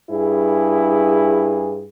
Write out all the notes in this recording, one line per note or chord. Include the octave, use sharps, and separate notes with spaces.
G2 E4 G#4